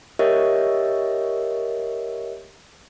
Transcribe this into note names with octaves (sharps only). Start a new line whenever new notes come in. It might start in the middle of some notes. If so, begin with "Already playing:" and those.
G4 A#4 C#5 D#5 E5